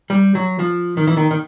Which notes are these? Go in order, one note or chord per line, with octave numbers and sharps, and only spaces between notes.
G3
F#3
F3
D#3
E3
D#3
D#3